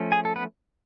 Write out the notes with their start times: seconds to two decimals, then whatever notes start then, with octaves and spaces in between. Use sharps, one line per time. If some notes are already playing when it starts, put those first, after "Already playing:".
Already playing: F3 A3 C#4
0.12 G#4 G#5
0.25 A4
0.36 B3 B4